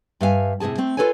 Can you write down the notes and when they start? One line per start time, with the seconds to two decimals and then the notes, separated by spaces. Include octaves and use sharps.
0.21 G2 E5 F5 G#5
0.60 A2 C3 F#3 G#4 A5
0.78 A3 C4
0.97 F4 G#4 A4 B4 C#5 G#5